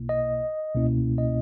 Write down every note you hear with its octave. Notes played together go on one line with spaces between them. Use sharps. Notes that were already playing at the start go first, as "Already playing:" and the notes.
Already playing: B1 B2 A#3 E4
D#5
C#2 B2 A#3 C#4 E4
D#5